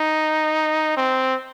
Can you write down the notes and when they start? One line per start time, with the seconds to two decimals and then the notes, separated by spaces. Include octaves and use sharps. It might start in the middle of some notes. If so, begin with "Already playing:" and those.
Already playing: D#4
0.97 C4